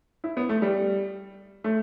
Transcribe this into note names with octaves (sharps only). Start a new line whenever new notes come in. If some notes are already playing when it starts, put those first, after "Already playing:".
E4
B3
A3
G3
A3